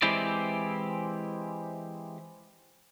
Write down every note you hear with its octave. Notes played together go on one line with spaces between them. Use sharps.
E3 G#3 C4 E4 G4 D5